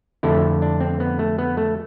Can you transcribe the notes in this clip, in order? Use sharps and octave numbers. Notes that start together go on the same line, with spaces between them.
F2 D3 A3 E4
D4
C4
B3
A3
B3
A3